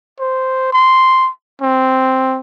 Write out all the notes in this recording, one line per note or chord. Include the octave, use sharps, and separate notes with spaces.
C5
C6
C4